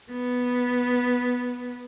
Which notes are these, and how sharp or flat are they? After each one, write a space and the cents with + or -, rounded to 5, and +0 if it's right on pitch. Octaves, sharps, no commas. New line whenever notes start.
B3 -5